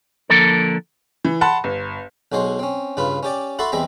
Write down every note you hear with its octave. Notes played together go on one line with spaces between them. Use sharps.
D3 F3 A#3 A4 A#4
E3
F#5 A5 B5 C6
G1
B1 F#3 G#3 C5 C#5
C4 C#4
G2 C#3 F4 B4
C#4 G4 D5
E4 F#4 A4 E5 A5 C6
E2 G3 G#3 C4 E5 A#5